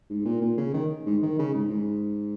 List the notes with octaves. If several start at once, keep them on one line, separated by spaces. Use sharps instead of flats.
G#2
A#2
A#2
C#3
D#3
G#2
D#3
C#3
G#2
G#2